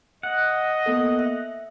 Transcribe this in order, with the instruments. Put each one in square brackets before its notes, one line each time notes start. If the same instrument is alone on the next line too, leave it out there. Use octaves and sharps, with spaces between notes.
[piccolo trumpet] D#5 [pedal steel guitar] F#5
[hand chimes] A#3 B3 A4
E5